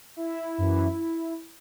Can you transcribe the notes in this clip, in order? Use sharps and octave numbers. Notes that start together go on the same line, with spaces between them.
E4
F#2 E3